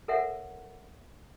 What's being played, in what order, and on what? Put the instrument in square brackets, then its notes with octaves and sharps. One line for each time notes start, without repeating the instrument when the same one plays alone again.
[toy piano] A4 A#4 C#5 E5 F#5